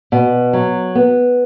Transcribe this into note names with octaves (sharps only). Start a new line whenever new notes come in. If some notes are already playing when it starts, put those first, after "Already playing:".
B2
F#3
B3